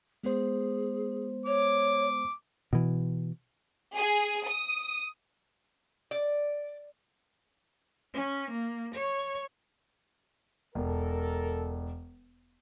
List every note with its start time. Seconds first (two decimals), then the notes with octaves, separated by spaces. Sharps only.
0.24 G#3 B3 G#4 C5
1.46 C#5 D6
2.73 B2 E3
3.96 G#4
4.46 D#6
6.11 D5
8.14 C#4
8.51 A#3
8.95 C#5
10.75 E1 A4 A#4